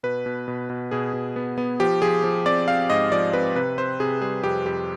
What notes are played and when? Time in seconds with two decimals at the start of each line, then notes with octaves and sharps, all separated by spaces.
0.03 B2 B4
0.26 B2
0.48 B2
0.70 B2
0.91 B2 G#4
1.13 B2
1.36 B3
1.58 B3
1.80 F3 G4
2.02 F3 G#4
2.24 F3
2.46 C4 D5
2.68 C4 F5
2.90 G#2 D#5
3.12 F3 D5
3.33 C4 B4
3.56 C3 B4
3.78 C4 C5
4.00 C3 G#4
4.22 G3 G#4
4.44 F2 G4
4.65 F2 G4